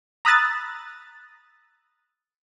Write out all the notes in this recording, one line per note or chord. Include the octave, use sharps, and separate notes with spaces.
A#5 B5 D#6 E6 F#6 A6